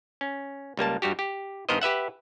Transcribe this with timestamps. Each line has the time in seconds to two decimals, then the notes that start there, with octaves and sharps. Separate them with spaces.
0.21 C#4
0.77 C#2 G3 A#3 A5
1.02 G2 G3 F#4 G4
1.19 G4
1.69 G2 D#3 B3 A#4 C5 D#5
1.82 G4 B4 E5 F#5